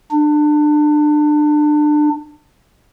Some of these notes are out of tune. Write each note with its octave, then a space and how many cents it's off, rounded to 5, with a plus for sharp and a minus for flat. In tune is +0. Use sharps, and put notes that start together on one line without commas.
D4 +30